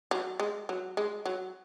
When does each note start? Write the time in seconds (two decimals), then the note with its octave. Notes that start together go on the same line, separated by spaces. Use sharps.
0.11 F#3
0.40 G#3
0.69 F#3
0.97 G#3
1.26 F#3